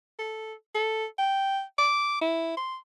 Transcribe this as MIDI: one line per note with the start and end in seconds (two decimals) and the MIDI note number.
0.19 0.53 69
0.75 1.05 69
1.18 1.62 79
1.79 2.17 86
2.21 2.55 64
2.57 2.76 84